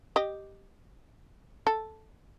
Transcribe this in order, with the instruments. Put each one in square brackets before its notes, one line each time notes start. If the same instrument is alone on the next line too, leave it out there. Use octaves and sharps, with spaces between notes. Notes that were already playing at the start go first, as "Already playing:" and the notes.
[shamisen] G4 D#5
A4